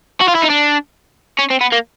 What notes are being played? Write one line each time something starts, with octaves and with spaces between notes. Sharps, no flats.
F#4
F4
E4
D#4
D4
C#4
C4
B3
A#3